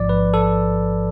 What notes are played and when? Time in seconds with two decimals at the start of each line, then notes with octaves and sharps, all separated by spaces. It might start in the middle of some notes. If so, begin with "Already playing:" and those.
Already playing: A1 G#2 F3 D5
0.09 B4
0.34 A4